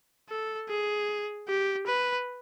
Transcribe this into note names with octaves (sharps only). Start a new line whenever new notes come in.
A4
G#4
G4
B4